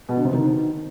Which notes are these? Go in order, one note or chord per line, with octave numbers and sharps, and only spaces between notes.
B2
D3
C3
D#3